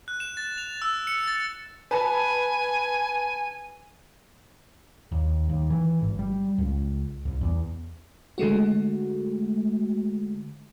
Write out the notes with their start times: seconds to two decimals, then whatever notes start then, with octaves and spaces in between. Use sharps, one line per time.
0.08 F#6
0.20 E7
0.37 A6
0.58 F7
0.82 E6
1.07 C#7
1.28 A6
1.91 B4 G#5 A5
5.12 D#2
5.49 D#2
5.70 E3
6.01 G#1
6.19 G3
6.58 C#2
7.25 C2
7.41 E2
8.38 D3 G#3 A3 F#4